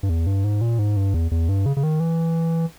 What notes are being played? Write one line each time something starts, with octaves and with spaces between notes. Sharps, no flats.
G2
E2
G2
G#2
A#2
G#2
G2
E2
E2
G2
C#3
C#3
D#3
E3